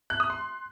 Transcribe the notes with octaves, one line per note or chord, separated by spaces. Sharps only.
F#6
D#6
C6